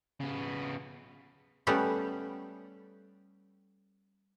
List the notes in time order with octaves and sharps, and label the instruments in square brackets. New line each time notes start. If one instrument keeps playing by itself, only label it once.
[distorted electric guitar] C#3 B3
[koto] G3 A3 B3 C#4 G4 D5